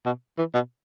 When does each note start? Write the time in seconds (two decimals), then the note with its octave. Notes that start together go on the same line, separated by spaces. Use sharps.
0.06 B2
0.38 E3
0.54 B2